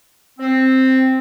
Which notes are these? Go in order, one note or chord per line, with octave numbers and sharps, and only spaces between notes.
C4